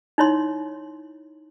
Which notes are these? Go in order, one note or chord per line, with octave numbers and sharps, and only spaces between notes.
D#4 E4 C#5 C6